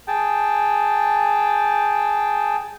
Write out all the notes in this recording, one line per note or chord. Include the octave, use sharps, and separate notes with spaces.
G#4 G5 A5